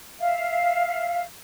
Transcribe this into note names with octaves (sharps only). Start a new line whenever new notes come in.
E5 F5